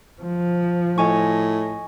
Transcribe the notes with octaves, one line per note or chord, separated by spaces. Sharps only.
F3
A2 D#5 G#5 C#6